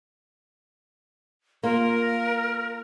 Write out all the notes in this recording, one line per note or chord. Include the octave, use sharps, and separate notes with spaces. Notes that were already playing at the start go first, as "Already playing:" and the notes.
A#3 F4 A#4